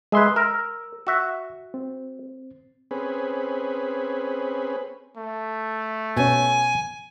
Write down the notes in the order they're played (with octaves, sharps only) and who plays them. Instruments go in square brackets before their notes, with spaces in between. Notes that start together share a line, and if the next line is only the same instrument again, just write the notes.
[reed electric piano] G#3 E5 C6 [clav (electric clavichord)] G#4 B4
[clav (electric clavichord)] A#4 [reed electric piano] E6
[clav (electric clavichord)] F#4 E5
[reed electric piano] C4
[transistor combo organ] C4 C#4 G#4 B4
[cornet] A3
[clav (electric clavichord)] B2 C#4 [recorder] G#5